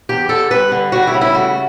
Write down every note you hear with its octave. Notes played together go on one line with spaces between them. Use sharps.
E2 G4
D3 A4
G2 B4
D3
G3 F#4
E4
C#3
E4
A3 F#4